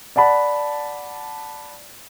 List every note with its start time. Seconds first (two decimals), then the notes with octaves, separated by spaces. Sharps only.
0.16 D5 F#5 A5 B5